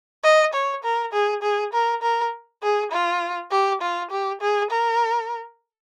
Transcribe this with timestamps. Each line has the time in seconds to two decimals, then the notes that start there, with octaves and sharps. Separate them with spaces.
0.24 D#5
0.53 C#5
0.84 A#4
1.13 G#4
1.43 G#4
1.73 A#4
2.02 A#4
2.63 G#4
2.92 F4
3.51 G4
3.82 F4
4.11 G4
4.41 G#4
4.71 A#4